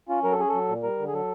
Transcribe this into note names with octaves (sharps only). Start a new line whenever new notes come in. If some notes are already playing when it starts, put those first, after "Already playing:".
C#4 F4
F#3 A#4
A4
C#4 G#4
F#3 A4
A#2
G3 A#4
D3
G#4
F#3 A4